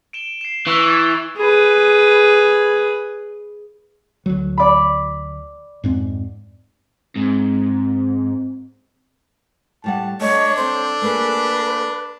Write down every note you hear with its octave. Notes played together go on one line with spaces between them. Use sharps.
D7 E7 G7
C7 E7
E3 C#6 E6 F#6
G#6 A6 E7
G#4 B4
D2 F#3
D5 B5
F2 G#2 C4
G#2 C4
A2 G3 F#5 A5
A3 D4 C#5 D#5
C4 A4 C5
A3 A#3 G#4 B4